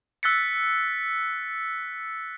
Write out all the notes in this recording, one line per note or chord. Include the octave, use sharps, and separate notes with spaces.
E6 F#6 A6 B6 C#7